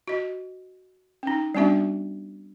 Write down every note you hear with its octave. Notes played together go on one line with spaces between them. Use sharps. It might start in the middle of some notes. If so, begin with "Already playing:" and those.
F#4 D#5
C#4 D#4
G3 B3 C#4 D4 F#4 E5